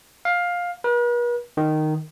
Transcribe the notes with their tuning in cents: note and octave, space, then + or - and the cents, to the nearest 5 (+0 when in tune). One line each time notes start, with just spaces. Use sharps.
F5 +15
B4 -45
D#3 -10